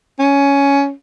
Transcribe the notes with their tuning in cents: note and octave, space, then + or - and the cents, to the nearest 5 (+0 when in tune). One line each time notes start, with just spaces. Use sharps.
C#4 +10